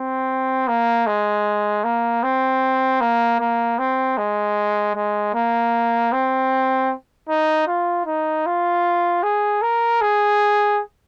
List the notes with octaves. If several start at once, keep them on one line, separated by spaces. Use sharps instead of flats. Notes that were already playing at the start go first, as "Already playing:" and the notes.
Already playing: C4
A#3
G#3
A#3
C4
A#3
A#3
C4
G#3
G#3
A#3
C4
D#4
F4
D#4
F4
G#4
A#4
G#4